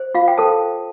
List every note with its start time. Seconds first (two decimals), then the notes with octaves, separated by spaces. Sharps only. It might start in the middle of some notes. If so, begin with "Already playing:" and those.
Already playing: C5
0.15 F4 F5
0.28 G5
0.37 A4 C5 A5